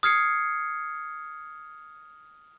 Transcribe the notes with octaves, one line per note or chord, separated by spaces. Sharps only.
D#6 F6 G#6 C7 C#7